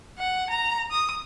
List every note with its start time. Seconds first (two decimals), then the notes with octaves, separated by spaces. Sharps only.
0.19 F#5
0.50 A#5
0.91 D#6